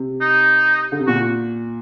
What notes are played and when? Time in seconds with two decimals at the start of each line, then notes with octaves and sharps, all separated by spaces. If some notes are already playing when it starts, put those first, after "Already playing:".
Already playing: C3
0.21 D#4
0.92 D3
1.00 C3
1.07 A#2 F#4